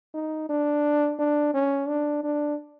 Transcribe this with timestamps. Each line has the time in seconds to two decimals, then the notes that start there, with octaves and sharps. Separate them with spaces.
0.14 D#4
0.49 D4
1.19 D4
1.54 C#4
1.88 D4
2.24 D4